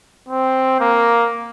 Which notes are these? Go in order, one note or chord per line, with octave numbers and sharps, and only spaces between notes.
C4
A#3